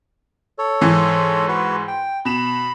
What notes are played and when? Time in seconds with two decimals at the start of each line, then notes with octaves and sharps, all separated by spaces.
0.58 A4 C#5
0.81 G#2 E3
1.48 F#4 B4
1.88 G5
2.25 B2 B5 E7